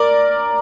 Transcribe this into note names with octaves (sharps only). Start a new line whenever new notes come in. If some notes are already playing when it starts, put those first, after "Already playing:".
Already playing: A#4 D5